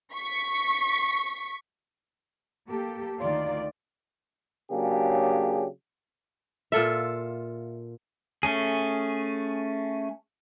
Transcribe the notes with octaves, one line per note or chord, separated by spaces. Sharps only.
C#6 B6
A#3 G4 A4
D2 D#3 F4 D5
C#3 F#3 A#3 D4 G4 G#4
A#2 F4 A4 E5
A3 C#4 G#4